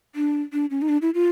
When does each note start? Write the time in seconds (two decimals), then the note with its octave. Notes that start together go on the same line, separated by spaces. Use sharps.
0.15 D4
0.53 D4
0.70 C#4
0.82 D#4
0.89 D4
1.02 E4
1.14 F4